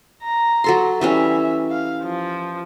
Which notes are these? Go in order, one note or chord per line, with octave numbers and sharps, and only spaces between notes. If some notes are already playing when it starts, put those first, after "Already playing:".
A#5
F#3 A4 C6
E3 G3 C#4 E5
F5
F3